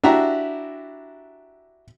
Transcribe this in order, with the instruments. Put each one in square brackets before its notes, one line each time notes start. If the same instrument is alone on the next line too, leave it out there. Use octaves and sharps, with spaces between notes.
[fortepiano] D4 E4 F#4 G4 E5 A#5